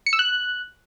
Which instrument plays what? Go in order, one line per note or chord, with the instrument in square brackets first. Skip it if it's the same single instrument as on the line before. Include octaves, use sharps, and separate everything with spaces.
[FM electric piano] C#7
E6
F#6